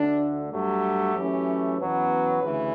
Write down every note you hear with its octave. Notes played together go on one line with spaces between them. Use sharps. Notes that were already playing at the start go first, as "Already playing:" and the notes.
Already playing: D2 D3 A3 D4
G2 F#3 A3 G4
F#2 E3 A3 C#4
E2 B2 F#3 C#4 B4
D2 C#3 E3